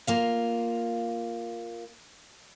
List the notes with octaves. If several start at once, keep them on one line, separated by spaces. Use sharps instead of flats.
A#3 F4 F5